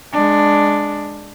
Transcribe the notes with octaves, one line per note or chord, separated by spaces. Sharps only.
G#3 D4